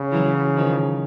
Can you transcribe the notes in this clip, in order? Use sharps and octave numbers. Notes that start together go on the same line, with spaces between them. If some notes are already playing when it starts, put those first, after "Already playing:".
Already playing: C#3
E3 F#3
D#3 F3